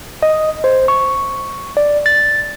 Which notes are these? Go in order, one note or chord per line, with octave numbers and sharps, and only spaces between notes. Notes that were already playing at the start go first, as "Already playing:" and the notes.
D#5
C5
C#6
D5
A6